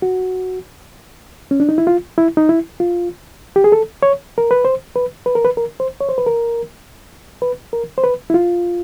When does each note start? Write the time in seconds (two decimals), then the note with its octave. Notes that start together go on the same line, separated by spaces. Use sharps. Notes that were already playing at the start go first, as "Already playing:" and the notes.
0.02 F#4
1.51 C#4
1.60 D4
1.69 D#4
1.78 E4
1.87 F4
2.18 E4
2.37 D#4
2.49 E4
2.80 F4
3.56 G4
3.64 G#4
3.72 A4
4.03 C#5
4.38 A#4
4.51 B4
4.65 C5
4.96 B4
5.26 B4
5.35 A#4
5.45 B4
5.57 A#4
5.80 C5
6.00 C#5
6.09 C5
6.18 B4
6.27 A#4
7.42 B4
7.73 A#4
7.98 C5
8.04 B4
8.30 E4
8.34 F4